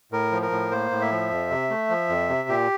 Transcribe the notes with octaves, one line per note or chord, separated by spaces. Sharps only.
A2 A#4
F3
A#4
A2
A#3 C5
A2
E5
F3
F2
C3
A3
F3
F2
C3
A#2 G4